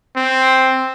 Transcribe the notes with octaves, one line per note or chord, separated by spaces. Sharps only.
C4